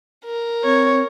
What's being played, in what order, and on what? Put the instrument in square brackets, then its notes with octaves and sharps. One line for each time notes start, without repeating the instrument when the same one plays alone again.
[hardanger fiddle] A#4
[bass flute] C4 [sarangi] C#5